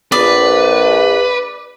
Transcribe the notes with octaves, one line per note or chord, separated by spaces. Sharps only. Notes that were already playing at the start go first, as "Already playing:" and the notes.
A#1 B4 D5